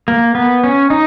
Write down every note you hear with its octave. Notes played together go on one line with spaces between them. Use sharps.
A#3
B3
C#4
D#4